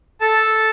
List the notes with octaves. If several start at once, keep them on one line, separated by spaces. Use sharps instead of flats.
A4 A5